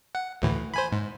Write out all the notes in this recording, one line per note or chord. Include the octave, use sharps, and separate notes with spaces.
F#5
D2 A2 E3
C5 G#5 B5
G#2